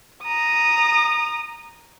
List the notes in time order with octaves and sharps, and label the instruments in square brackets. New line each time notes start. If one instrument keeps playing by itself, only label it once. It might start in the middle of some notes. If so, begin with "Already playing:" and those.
[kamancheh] A#5 D#6